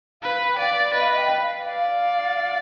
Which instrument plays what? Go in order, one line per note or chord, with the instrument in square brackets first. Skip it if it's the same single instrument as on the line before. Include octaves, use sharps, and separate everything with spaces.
[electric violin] B4 [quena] F5
[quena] G5
[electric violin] D5 [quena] F5
[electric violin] B4 [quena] D#5
[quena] F5
D#5
G5
F5
[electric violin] D5 [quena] F5